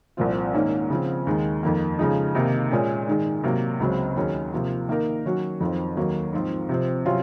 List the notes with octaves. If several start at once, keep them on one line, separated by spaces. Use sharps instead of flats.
C2 A#2 F3 C4 F4
G#2 D#3 A#3 C#4
C#3 F3 C4
D#2 D#3 G#3
F2 D#3 A#3
C#3 F3 G#3 D#4
C3 D#3 A#3 D#4
A#2 G#3 C#4 G#4
G#2 D#3 G#3
C3 F#3 A#3
C#2 C#3 F#3 C4
D#2 D#3 F#3 C#4 G#4
C3 F3 A#3 F4
D#3 A#3 D#4 A#4
D#3 F#3 C#4 F#4
F2 D#3 F#3 C4 F4
D#2 D#3 F#3 A#3
G#2 F3 C4 F4
C3 F3 C4
C3 F#3 C#4 F4